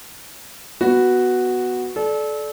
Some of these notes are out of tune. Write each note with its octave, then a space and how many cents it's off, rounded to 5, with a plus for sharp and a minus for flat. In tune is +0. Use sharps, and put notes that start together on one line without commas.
B3 +0 F#4 +0 B4 +0
A4 -30 D5 +0